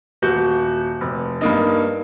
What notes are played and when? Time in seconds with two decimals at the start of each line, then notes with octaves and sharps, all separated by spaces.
0.22 D#1 F#4 G6
1.01 F1
1.41 G2 A#3 D#4